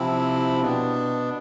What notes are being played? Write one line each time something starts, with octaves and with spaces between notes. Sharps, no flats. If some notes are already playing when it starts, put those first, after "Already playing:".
Already playing: C3 F3 C4 E4
B2 B3 D4